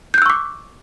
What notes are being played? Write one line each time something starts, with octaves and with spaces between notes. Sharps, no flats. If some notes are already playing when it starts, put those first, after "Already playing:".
C#6 D6 E6 F#6 G6